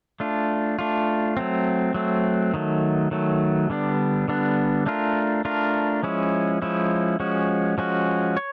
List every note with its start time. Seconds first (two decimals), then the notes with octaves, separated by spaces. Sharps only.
0.20 A3 D4 F4
0.79 A3 D4 F4
1.37 F#3 A3 C4
1.94 F#3 A3 C4
2.54 D#3 F#3 A3
3.11 D#3 F#3 A3
3.70 D3 G3 B3 D4
4.28 D3 G3 B3 D4
4.86 A3 D4 F4 A#4
5.45 A3 D4 F4 A#4
6.03 F3 G#3 C#4 E4
6.62 F3 G#3 C#4 E4
7.20 F3 G#3 C#4 F#4
7.78 F3 G#3 C#4 F#4
8.37 C#5